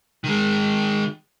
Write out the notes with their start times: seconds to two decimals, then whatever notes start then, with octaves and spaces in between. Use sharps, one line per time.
0.24 D#3 G#3